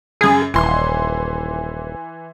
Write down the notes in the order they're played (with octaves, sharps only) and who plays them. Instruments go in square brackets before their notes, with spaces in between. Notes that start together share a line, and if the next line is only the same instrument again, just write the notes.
[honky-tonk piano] F#2 C#3 [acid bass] G#4
[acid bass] D#1 [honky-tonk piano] E3 C6